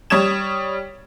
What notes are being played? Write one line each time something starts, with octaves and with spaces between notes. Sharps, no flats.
G3 C#5 D#6 G#6 E7